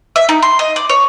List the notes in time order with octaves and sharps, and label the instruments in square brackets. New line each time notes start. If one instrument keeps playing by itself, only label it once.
[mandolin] E5
D#4
C6
D#5
D5
C#5